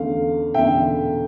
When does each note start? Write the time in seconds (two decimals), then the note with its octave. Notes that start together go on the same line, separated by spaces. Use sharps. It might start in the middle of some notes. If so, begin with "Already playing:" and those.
Already playing: E2 D3 A3 C#4 F5
0.54 E2 D3 A3 C#4 E5 G5